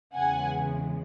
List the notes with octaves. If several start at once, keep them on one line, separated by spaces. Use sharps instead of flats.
E2 C#3 E3 G#3 F#5 G#5